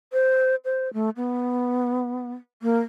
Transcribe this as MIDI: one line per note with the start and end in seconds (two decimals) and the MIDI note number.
0.13 0.55 72
0.65 0.92 72
0.93 1.10 57
1.17 2.32 59
2.62 2.79 58